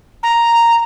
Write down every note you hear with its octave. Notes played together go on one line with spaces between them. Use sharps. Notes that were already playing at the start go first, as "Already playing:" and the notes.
A#5